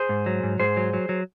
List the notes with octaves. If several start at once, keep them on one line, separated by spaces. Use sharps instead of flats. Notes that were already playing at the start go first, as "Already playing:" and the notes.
Already playing: G#4 C5
G#2
F#3
G#2
G#2 G#4 C5
F#3
F#3
F#3